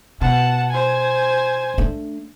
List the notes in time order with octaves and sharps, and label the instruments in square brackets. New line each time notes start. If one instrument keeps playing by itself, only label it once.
[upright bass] B2 [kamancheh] F#5 A5
[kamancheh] C5 G#5
[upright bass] A3 D4